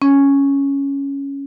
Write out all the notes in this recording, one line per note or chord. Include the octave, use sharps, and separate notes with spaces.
C#4